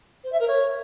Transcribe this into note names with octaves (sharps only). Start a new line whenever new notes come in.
C5
E5
A#4
C#5